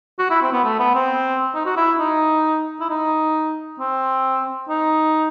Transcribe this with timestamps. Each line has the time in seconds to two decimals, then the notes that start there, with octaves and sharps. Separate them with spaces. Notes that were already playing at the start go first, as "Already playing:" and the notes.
0.19 F#4
0.30 E4
0.42 C4
0.52 B3
0.64 A3
0.79 B3
0.95 C4
1.54 D#4
1.66 F#4
1.77 E4
1.99 D#4
2.80 E4
2.90 D#4
3.79 C4
4.69 D#4